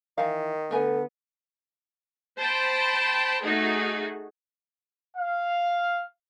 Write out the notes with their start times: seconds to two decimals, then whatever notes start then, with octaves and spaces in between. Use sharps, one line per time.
0.18 D#3 E3 F5
0.71 D3 A3 B3 A4 A#4 G#5
2.39 C5 G5 A5 B5
3.44 A3 D#4 F#4 G#4
5.17 F5